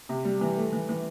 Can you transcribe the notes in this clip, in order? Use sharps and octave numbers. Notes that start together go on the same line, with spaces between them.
C3
G3
E3
A3
E3
E3